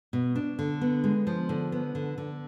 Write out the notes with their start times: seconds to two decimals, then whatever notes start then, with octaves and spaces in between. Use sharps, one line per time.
0.13 B2
0.36 D4
0.59 D3
0.81 B3
1.04 G#3
1.27 F3
1.49 D3
1.72 B3
1.95 D3
2.18 D3